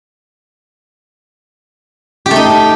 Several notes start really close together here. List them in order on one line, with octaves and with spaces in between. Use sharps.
G4 A3 D#4